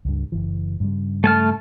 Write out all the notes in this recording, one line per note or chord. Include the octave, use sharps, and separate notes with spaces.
C#2 G2
F#1 C#2 E3
G2 C#3 G3
A3 A5 F6